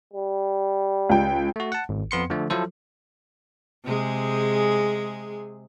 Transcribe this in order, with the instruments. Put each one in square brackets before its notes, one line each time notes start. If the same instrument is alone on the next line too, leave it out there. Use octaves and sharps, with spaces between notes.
[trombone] G3
[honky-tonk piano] C#2 G5
[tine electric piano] A3 F#4
F#5 A5
G#1
F2 B3 C6 C#7
D3 F3 A3
F3 F#3 E4 A4 C5
[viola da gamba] C3 G#3 G#4